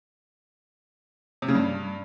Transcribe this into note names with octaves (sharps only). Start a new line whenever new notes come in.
C3
C#3
G2